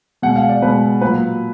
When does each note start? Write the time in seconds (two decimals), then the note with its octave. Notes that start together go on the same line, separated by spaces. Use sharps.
0.22 B2 G#3 F#5
0.36 F5
0.49 D5
0.62 B2 G#3 B4
1.01 A#2 F#3 A#3 B4